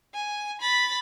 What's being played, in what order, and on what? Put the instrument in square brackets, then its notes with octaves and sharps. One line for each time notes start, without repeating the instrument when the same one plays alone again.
[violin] G#5
B5 A6